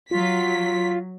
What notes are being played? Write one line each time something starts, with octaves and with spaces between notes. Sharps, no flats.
F#3 F4 B6